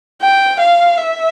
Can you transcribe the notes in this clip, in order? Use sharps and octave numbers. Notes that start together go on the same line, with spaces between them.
G5
F5
E5